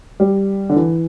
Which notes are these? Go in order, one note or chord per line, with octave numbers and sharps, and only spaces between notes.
G3
D3
E3